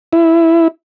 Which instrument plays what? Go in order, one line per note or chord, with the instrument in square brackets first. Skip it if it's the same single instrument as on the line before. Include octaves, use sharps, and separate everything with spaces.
[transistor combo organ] E4